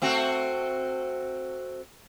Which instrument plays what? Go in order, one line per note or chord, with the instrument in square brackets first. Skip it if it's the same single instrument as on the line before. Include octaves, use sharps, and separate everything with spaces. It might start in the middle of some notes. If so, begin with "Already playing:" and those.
[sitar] A3 C4 F#4